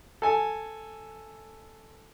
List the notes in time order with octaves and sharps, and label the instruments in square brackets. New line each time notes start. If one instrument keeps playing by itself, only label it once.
[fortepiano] A4 G#5